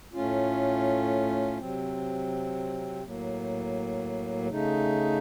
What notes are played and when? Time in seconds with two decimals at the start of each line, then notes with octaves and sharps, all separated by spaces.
0.13 A2 A3 C#4 F4
1.58 C3 F#3 C4
3.03 A2 F#3 A#3
4.48 C#3 A3 D#4